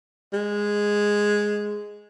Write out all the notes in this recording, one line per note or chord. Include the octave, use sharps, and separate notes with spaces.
G#3